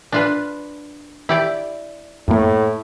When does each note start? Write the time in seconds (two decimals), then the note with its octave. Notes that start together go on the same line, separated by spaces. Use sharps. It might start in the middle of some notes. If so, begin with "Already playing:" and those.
0.12 D4 F4 B4
1.29 E4 G4 D5
2.28 F#2 A2 A#3